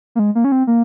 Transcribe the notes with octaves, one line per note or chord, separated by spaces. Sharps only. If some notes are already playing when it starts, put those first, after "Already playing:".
A#3
G#3
A#3
C#4
C4
A#3